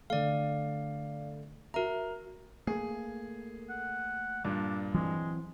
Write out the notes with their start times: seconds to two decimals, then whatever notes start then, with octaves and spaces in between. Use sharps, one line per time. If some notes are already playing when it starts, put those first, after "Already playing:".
0.10 D3 A3 D5 F5
1.74 F#4 A#4 E5 A#5
2.67 A3 A#3 G#4
3.69 F#5
4.44 G2 A#2 D4
4.94 E3 F#3 G#3 C4